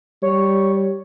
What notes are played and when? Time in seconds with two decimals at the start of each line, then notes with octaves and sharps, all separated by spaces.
0.22 G3 C#5